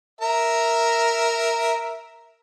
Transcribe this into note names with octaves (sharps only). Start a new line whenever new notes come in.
A#4 E5 A#5